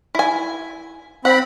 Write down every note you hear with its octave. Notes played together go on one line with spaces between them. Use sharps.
E4 G#5
C4 F#5 B5